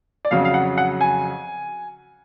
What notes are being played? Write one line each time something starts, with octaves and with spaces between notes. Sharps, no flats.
D5
F2 C#3 F#3 F5
F5
F#5
F#5
G#5